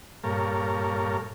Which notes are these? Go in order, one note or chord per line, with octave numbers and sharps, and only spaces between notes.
G2 A#2 A4 A#4 C#5 F5